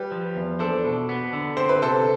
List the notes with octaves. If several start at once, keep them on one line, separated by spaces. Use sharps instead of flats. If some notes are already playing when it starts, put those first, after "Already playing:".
Already playing: G3 G4 B4
F3
E2
D4 A4 C5
B2
B3
D3
C4 C5
B4
C3 A4 C5